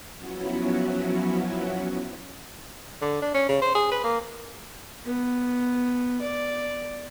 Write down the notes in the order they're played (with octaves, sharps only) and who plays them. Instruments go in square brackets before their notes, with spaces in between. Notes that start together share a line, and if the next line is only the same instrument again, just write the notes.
[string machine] F3 F#3 B3 C#4 E4 F#4
[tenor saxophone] D3
D4
C#4
C#3
C5
G#4
B4
A#3
[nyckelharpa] B3
D5